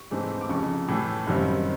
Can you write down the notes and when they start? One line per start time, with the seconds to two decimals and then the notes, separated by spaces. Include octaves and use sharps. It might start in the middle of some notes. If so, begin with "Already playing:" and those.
Already playing: C#6
0.11 G#2 E3 A3 C4
0.41 D6
0.49 F1 F2 C#3 C#6
0.88 A2 E3 A3
1.27 F#1 F#2 D#3 G3 C4